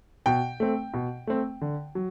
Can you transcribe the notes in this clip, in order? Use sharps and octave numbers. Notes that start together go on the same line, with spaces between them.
B2 G5
A3 C4
B2
A3 C4
D3
F#3